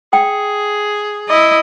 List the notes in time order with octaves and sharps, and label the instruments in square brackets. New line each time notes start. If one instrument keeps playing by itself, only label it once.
[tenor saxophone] G#4 [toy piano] G5
[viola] E4 D#5